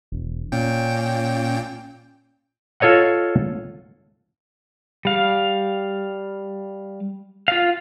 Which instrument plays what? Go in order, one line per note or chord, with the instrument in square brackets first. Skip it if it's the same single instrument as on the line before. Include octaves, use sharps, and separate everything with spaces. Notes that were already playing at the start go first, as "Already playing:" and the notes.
[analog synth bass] E1
[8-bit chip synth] A#2 G5 [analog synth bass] C#4
[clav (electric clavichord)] F4 A4 C#5 D#5 F#5
[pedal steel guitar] G3 F5
F4 F5